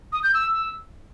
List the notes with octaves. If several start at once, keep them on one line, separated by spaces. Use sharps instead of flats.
D#6
G6
E6